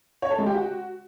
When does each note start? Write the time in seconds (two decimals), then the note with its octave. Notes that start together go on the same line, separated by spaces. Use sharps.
0.22 C#5
0.30 A4
0.38 G#3
0.46 G4
0.54 F#4